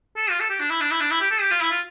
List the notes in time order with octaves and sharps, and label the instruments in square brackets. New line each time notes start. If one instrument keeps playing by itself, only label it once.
[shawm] A4
F4
A4
G4
D4
E4
D4
E4
D4
E4
G4
A4
G4
F4
E4
F4